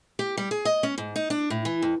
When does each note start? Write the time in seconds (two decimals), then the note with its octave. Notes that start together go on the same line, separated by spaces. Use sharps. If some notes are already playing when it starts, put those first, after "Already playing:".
0.19 G4
0.37 G3
0.51 G#4
0.65 D#5
0.83 C#4
0.98 G#2
1.16 D#4
1.30 D4
1.50 A2
1.65 E3
1.82 F2